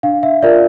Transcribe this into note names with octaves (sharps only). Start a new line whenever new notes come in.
D4 F5
E5
F4 A#4 D5 E5